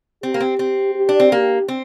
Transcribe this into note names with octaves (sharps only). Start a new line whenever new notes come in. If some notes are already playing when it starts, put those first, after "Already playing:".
C4 G4
A#3
C4
C4
G4
D4
C4
A#3 G4
C4